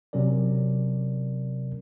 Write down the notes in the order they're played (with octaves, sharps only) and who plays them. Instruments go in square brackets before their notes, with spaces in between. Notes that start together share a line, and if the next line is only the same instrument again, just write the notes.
[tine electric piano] C3 F#3 C#4 A#4 D5